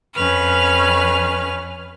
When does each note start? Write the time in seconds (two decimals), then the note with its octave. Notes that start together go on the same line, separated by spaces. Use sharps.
0.14 F2 C#4 B4 F6